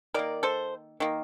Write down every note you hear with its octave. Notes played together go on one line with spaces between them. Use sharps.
D#3 A#3 A#4 D5
A4 C5
D#3 A#3